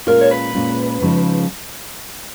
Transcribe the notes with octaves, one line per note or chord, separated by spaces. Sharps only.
A#2 G#3 C#4 F4 A#4
C#5
B4
A#2 G#3 C#4 F4
C#3 F3 G#3 D#4